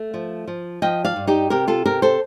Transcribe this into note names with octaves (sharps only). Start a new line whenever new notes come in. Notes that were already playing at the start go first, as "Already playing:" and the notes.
Already playing: A3
F3
F3
F3 D#5 G5
D5 F5
G2
D#4 G4
C3 G4 A#4
F4 A4
C3 G4 A#4
A4 C5